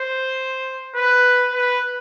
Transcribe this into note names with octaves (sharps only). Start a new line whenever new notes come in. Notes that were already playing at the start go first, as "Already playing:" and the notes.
Already playing: C5
B4
B4